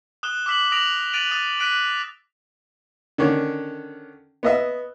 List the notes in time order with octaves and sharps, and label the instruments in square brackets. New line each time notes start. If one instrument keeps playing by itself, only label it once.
[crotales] D#6 F#6 E7 G7
D6 E6 B6 F#7
D#6 A#6 D7 F7 F#7
F#6 A6 D7 D#7 F7 F#7
D#6 A6 D#7
F#6 B6 D7 D#7
[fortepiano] D3 D#3 C#4
B3 D#5 E5